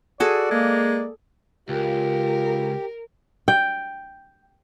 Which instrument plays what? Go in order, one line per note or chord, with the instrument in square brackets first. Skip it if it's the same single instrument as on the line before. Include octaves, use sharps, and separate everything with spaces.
[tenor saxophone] F#4 [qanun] G#4 A4 [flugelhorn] D5
[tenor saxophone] G#3 [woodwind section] A#3
[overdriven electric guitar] C#2 [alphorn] F4 [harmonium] G4 [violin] A#4
[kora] G5